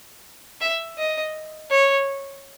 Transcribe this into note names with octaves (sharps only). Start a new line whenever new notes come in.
E5
D#5
C#5